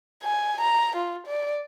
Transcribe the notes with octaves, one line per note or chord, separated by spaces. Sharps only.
G#5
A#5
F4
D5